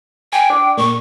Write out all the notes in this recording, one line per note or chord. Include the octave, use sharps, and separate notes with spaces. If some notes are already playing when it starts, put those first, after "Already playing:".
G5 G#5
D4
A#2 C#6